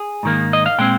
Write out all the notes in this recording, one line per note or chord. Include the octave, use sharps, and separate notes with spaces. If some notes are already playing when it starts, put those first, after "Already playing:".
Already playing: G#4
G#2 D#3 A#3
D#5
F5
A#2 G#3 C4 G5